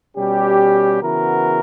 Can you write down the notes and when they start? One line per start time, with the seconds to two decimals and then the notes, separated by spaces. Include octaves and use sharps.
0.17 B2 G3 C#4 G4
1.01 C#3 E3 B3 F#4 A#4